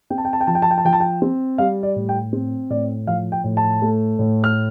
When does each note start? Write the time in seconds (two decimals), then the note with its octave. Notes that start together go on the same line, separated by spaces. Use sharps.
0.10 C4 G5
0.18 A5
0.25 G5
0.33 A5
0.41 G5
0.47 F3 A5
0.55 G5
0.62 A5
0.71 G5
0.78 A5
0.85 F3 G5
0.93 A5
1.00 G5
1.22 C4
1.58 G3 F5
1.83 D5
1.96 A2
2.09 G5
2.33 C4
2.70 A2 D5
3.07 F3 F5
3.32 G5
3.44 A2
3.57 A5
3.82 A3
4.19 A2
4.44 F6